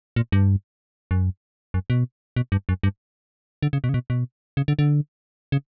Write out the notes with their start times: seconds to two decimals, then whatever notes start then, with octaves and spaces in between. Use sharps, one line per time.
0.16 A#2
0.32 G2
1.11 F#2
1.74 F#2
1.90 B2
2.36 B2
2.52 G2
2.69 F#2
2.83 G2
3.62 D3
3.73 C#3
3.84 B2
3.89 C#3
3.94 B2
4.10 B2
4.57 C#3
4.68 D3
4.79 D3
5.52 C#3